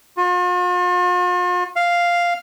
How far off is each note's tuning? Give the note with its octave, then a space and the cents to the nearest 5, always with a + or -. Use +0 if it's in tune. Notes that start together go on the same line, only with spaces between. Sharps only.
F4 +45
F5 -5